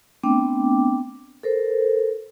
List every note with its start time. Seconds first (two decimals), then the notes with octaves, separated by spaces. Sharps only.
0.23 A3 B3 C4 D4 G5 D6
1.43 A4 A#4 C5